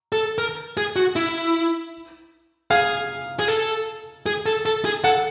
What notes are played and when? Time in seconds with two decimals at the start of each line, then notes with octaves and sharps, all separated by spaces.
0.12 A4
0.38 A#4
0.77 G#4
0.96 F#4
1.16 E4
2.71 G#4 F5
3.39 G#4
3.48 A4
4.26 G#4
4.46 A4
4.66 A4
4.85 G#4
5.04 A4 F#5